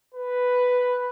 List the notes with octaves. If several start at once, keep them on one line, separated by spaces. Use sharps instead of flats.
B4